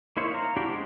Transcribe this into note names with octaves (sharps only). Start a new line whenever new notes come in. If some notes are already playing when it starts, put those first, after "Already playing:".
A#3 D#4 E4 C5 C#5
F5 A#5
D4 E4 F#4 G4 D5
G#3 C5